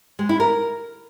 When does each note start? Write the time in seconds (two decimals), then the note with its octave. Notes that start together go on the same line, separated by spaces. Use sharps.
0.19 G#3
0.29 E4
0.40 A#4